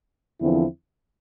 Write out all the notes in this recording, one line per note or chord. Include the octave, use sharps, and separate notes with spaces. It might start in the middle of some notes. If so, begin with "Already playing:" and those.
E2 D3 F3 C4 E4